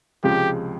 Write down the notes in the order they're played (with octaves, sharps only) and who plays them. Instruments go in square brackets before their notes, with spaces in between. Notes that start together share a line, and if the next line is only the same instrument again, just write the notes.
[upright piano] C#2 C3 F3 G#3 [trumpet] G4